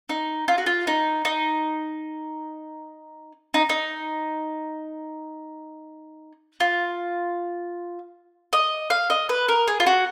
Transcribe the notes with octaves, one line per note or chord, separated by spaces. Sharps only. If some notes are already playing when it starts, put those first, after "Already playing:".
D#4
F4
F#4
F4
D#4
D#4
D#4
D#4
F4
D#5
F5
D#5
B4
A#4
G#4
F4
F#4